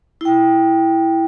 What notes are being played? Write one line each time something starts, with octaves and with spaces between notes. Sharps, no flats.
E4 G5